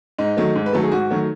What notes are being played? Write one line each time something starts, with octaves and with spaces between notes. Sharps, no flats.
G#2 D#4
D#3 F#3 A3
G#2
B4
D#3 F#3 A3 A4
G#4
G#2 F#4
D#3 F#3 A3